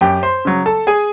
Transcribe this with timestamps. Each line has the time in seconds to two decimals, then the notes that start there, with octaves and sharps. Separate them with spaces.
0.01 F#2 G4 G5
0.23 C5 C6
0.45 C#3 F#3
0.66 A4 A5
0.87 G#4 G#5